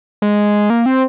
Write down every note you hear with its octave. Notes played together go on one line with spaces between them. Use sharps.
G#3
A#3
C4